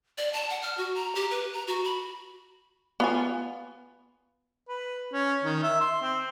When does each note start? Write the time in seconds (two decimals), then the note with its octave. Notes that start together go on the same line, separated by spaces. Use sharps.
0.18 D5
0.33 A5
0.50 F#5
0.62 F6
0.77 F#4
0.95 A#5
1.15 G4
1.31 B4
1.53 A#5
1.67 F#4
1.84 B5
3.00 B3 F4 G#5
4.69 B4
5.13 C#4
5.44 D#3
5.63 E5
5.81 C6
6.02 C4